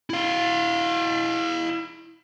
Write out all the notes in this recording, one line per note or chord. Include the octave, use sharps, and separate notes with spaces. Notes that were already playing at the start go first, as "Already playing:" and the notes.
E4 F5